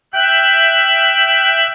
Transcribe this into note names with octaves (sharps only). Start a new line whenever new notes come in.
E5 G5 F#6